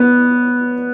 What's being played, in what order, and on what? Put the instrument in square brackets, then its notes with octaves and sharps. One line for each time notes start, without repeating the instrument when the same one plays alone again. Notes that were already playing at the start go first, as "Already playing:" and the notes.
Already playing: [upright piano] B3